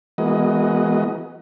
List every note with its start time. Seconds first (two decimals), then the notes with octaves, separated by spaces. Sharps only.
0.18 E3 G#3 A#3 B3 F#4 D#5